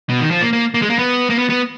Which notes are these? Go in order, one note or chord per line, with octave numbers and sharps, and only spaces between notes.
B2
D#3
F3
A#3
A#3
A#3
G#3
A#3
B3
A#3
B3
B3